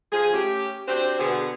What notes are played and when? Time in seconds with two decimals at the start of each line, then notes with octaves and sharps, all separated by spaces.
0.11 F3 G#4
0.33 A3 C#4 G4
0.88 C4 D4 F#4 G4 C5
1.19 B2 D3 B3 G#4